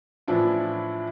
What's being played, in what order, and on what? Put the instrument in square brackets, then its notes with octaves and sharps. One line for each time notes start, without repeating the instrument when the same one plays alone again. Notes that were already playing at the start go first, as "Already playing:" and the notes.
[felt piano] A2 E3 F3 D4 E4 F4